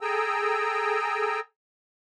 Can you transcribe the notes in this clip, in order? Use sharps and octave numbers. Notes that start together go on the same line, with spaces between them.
G#4 A4 G5 G#5 A#5 E6